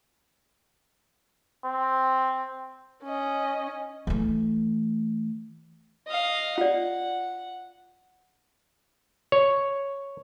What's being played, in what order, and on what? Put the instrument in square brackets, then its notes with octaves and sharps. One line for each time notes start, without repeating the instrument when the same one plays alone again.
[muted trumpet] C4
[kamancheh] C#4 D#5
[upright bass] E3 A3
[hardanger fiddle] D#5 F5
[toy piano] F4 D5 [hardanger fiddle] F#5
[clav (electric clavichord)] C#5